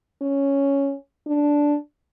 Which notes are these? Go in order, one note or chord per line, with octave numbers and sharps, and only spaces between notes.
C#4
D4